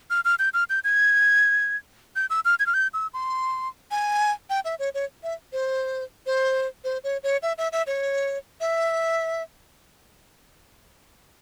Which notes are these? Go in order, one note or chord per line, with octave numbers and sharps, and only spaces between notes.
F6
F6
G6
F6
G6
G#6
G6
E6
F6
G#6
F6
G6
E6
C6
G#5
G5
E5
C#5
C#5
E5
C5
C5
C5
C#5
C#5
E5
E5
E5
C#5
E5